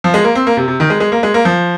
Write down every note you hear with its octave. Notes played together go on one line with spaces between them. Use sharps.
F3
G#3
A#3
C4
A#3
C3
C3
D#3
G#3
G#3
A#3
G#3
A#3
F3